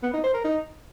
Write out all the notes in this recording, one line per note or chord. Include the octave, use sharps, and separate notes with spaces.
B3
D#4
C5
A#4
D#4